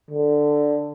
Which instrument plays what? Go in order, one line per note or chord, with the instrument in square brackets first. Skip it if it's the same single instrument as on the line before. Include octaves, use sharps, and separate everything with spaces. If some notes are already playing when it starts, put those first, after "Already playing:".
[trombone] D3